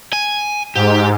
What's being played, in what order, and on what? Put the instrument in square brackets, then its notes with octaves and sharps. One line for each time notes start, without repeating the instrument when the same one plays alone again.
[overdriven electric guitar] G#5
[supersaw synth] G#2 [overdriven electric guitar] G4